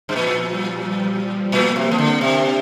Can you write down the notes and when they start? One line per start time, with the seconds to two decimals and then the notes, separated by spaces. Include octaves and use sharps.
0.09 G2
0.16 A#2 F3
0.51 G3
0.84 G3
1.52 A#2 A#3
1.76 C3
1.87 F3 C4
1.98 D3
2.21 C3 D4